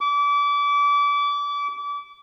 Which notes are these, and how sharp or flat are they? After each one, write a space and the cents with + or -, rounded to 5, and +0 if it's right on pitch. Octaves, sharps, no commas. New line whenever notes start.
D6 -30